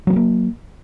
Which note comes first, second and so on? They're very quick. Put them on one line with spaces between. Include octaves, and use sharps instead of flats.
F#3 B3 G#3 A#3